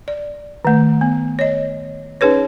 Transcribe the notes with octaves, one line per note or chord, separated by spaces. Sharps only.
D5
D#3 A3
B3
C#5 D#5
C#4 D#4 G#4 B4 C#5